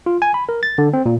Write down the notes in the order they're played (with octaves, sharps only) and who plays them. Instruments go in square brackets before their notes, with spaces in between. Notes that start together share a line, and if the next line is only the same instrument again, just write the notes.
[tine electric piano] F4
G#5
B5
A#4
A6
D3
C4
A#2